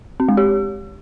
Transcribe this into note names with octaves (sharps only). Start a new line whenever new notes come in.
C4
G#3
G4